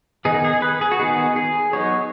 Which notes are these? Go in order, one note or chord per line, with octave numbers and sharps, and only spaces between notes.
D#3 B3 D#4 G#4
G#4
B4
G#4
F#4
D#3 B3 D#4 G#4
G#4
F#3 B3 D#4 C#5